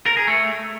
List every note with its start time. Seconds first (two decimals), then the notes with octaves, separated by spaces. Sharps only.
0.06 A#4
0.17 G#4
0.27 A3